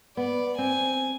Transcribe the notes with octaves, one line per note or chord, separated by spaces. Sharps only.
B3 D5
C4 G#5